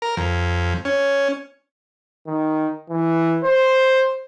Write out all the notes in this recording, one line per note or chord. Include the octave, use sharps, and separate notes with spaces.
A#4
F2
C#4
D#3
E3
C5